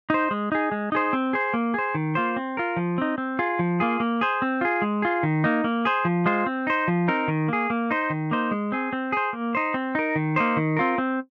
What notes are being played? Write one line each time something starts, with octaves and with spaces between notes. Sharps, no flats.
D#4 C5
G#3
D#4 G#4
G#3
D#4 G#4 C5
C4
G#4 C5
A#3
G#4 C5
D#3
A#3 F4 C5
C4
F4 A#4
F3
C4 D#4
C4
F4 G#4
F3
A#3 F4 G#4
A#3
G#4 C5
C4
F4 G#4
G#3
F4 G#4
D#3
A#3 D#4
A#3
G#4 C5
F3
G#3 F4 C5
C4
D#4 C5
F3
C4 D#4 A#4
D#3
A#3 G#4
A#3
D#4 C5
D#3
A#3 D#4 C5
G#3
C4 G#4
C4
G#4 C5
A#3
D#4 C5
C4
D#4 A#4
D#3
A#3 D#4 C5
D#3
C4 F4 A#4
C4